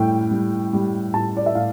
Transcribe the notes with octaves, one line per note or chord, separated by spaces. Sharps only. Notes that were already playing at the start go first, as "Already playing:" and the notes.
Already playing: A2 G3 G5
G3
G3
A2 A5
D5
E5
A2 F5